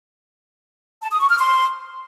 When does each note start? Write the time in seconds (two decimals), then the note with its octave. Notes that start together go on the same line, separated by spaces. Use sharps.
1.02 A5
1.11 D#6
1.20 C#6
1.29 F6
1.39 C6